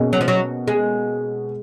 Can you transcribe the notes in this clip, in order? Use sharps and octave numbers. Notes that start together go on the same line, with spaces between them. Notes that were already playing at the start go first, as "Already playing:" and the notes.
Already playing: B2 A#3 C#4 G#4 D#5
F#3
F3
F#3
G#3